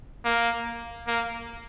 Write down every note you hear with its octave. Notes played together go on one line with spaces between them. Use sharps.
A#3
A#3